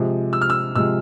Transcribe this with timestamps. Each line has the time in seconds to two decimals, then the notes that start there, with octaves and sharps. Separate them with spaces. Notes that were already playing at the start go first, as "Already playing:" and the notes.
Already playing: C3 F3 G#3
0.33 E6
0.41 F6
0.50 E6
0.75 C3 F3 G#3 E6